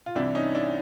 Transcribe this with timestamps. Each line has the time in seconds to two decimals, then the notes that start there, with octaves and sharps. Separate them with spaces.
0.06 F4
0.15 C2 C3 E3 D4 E4
0.35 C#4 D#4
0.55 D4 E4